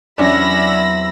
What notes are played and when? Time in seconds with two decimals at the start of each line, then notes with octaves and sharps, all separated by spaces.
0.18 E2 C3 F#3 C#4 D4 B5 E6 A#6
0.50 E4